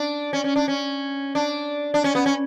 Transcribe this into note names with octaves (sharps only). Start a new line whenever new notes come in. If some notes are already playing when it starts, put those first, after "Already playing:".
Already playing: D4
C#4
C#4
D4
C#4
D4
D4
C#4
B3
C#4